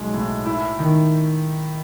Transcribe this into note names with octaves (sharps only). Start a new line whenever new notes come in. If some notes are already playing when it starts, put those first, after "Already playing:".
Already playing: B1 G#3
A2
E4
D#3